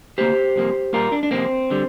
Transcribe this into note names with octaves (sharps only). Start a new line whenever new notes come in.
D2 C3 A#3 G4 C5
C2 C3 F3 A#3
A#2 G3 A#3 F4 A#4
D4
D4
F2 C3 A#3 C4
D3 G3